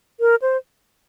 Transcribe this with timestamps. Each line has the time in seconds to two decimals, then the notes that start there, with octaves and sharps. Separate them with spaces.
0.20 A#4
0.42 C5